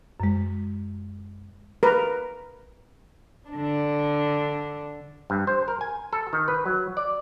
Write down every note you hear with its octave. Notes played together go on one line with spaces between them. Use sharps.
F#2 G#3
A#4 B4
D3 D4
G2
C5
A#4
G#5
A4
D#3
B4
F#3
D5